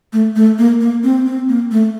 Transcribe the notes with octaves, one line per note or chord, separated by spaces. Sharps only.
A3
A3
A#3
A#3
C4
C4
A#3
A3